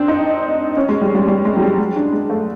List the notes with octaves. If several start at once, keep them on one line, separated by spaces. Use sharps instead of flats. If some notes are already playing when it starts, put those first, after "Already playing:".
Already playing: C4 D4
D#4
C#4
G#3
G3
G3
G3
G#3
F#3
G3
G#3
D4
G#3
A3